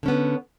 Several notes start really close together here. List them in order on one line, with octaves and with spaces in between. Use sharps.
D3 C#4 B3